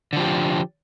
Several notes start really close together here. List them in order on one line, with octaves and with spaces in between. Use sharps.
D3 F3 G4